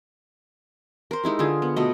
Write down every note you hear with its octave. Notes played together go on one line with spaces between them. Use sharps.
A#4 C5
G#3 D#4 E4 G4
D3 F4 G#4
B3
B2 A3 D#5